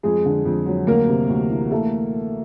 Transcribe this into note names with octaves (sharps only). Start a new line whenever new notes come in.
F2 G#3 G#4
D3
F2
F#3
D2 A#3 A#4
C3
D2
E3
A3 A#3 A4